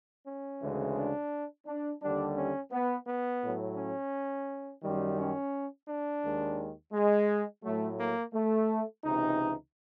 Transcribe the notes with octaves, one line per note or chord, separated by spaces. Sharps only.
C#4
D2 C#3 E3 G#3
D4
D4
D#2 D3 G3 D4
C#4
B3
B3
A2 F#3
C#4
F#2 D#3 G3
C#4
D4
D#2 D#3 G#3
G#3
A2 F#3 A3
A#3
A3
C#2 C3 E3 D#4